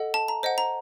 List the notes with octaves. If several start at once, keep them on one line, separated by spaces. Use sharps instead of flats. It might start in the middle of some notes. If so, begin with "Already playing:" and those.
Already playing: A4 D#5 F#5
A5
A#5
C5 D#5 F#5
A#5